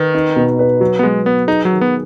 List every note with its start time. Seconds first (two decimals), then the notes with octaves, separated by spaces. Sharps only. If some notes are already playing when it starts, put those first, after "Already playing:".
Already playing: D#3 B4
0.15 D#4
0.36 B2
0.59 B4
0.80 F#3 F#4
0.99 B3
1.03 F#3 G#3
1.26 B3 B4
1.47 D#4 G#4
1.65 F#3
1.70 D#3
1.81 B3